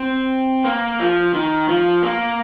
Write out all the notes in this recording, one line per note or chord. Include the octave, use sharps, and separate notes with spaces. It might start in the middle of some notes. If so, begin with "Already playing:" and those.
Already playing: C4
A#3
F3
D#3
F3
A#3